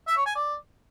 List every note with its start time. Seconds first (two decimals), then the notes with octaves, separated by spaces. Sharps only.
0.07 E5
0.17 C#5
0.26 G#5
0.35 D5